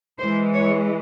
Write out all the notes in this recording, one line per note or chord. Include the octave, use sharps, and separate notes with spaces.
E3 G#3 C5
C#5